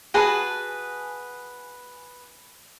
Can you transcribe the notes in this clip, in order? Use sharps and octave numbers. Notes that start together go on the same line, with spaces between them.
F#4 G#4 B4 A5